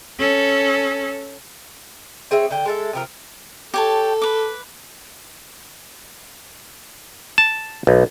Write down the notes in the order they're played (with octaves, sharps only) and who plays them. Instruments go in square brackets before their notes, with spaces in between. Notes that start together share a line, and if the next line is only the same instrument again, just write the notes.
[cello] C#4 A4
[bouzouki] C4 G#4 C#5 E5
D3 G5
G#3 A4 E5
C3 F3 A#4
[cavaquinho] G4 C#5 A5 [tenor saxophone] A4
[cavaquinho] B4 D6
[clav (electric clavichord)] A5
B1